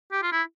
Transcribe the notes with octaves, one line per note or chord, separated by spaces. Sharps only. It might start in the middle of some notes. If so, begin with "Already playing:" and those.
G4
F4
E4